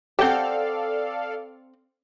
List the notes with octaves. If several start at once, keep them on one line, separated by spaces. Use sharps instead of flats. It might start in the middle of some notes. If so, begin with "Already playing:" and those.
C4 G4 A4 D5 F5 F#5 A5 G6